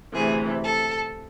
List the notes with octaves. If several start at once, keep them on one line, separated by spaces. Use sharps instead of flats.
D2 C3 E3 G#4
A4